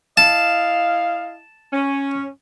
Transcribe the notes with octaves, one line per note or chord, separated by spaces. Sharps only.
E4 D#5 F5 A5
C#4